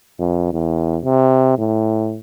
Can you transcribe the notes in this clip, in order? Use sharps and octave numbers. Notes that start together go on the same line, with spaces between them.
F2
E2
C3
A2